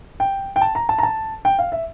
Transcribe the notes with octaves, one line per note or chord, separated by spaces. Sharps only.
G5
G5
A5
A#5
A5
A#5
A5
G5
F5
E5